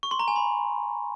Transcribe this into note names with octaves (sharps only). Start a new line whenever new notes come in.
C#6
C6
A#5
G#5
B5